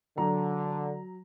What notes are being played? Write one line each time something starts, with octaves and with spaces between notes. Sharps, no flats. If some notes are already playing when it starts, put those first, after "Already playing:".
D3 F#3 A#5